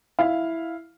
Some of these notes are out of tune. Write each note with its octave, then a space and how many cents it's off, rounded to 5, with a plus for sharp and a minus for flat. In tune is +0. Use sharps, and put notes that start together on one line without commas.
E4 +0 F5 +0